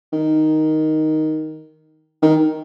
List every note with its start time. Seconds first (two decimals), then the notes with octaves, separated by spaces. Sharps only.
0.13 D#3
2.22 D#3